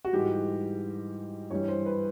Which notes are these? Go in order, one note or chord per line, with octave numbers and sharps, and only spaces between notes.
F#4
G#2 E3 G3 G4
G2 E3 G3 C#5
C5
B4